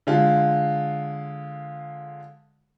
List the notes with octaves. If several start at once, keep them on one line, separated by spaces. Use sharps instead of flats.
D3 G#3 F4